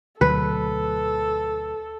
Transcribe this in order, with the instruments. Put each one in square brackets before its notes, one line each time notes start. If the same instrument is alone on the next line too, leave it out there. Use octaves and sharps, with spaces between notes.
[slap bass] D2 B2 F#3 [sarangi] A4 [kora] B4